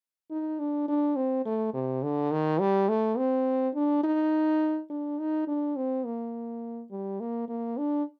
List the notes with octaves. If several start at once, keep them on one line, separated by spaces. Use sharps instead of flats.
D#4
D4
D4
C4
A3
C3
D3
D#3
G3
A3
C4
D4
D#4
D4
D#4
D4
C4
A#3
G3
A#3
A#3
D4